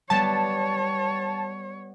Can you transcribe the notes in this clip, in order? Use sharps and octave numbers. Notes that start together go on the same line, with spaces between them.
G3 B3 C#5 A5